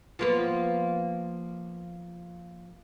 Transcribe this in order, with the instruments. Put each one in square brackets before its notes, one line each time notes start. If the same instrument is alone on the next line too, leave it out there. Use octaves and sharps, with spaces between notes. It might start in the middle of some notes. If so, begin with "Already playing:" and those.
[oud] F3 A#3 B3